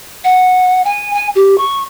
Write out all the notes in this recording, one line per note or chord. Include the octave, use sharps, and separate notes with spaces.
F#5
G#5
G#5
G4
C#6